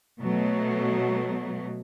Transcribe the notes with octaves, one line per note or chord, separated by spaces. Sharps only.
B2 F#3 A3